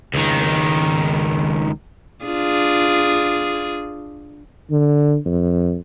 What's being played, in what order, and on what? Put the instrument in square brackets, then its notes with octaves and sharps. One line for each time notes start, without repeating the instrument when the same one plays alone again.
[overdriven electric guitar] C#2 D#3
[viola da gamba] D4 F4 G#4
[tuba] D3
F2